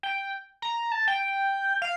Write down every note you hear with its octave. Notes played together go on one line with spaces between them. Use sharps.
G5
A#5
A5
G5
F5